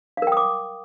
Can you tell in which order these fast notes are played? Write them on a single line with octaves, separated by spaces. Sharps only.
F5 A#4 G5 D#6 D6